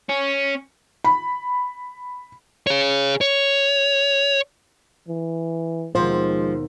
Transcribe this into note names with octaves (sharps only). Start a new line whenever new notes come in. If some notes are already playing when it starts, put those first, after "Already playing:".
C#4
B5
G#4 C#5
C#5
E3
D#2 B2 F3 G#3 C5